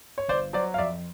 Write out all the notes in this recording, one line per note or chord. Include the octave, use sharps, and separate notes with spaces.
C#5
G1 C5 D5
F#3 C5 D5
F5
F2 D5 E5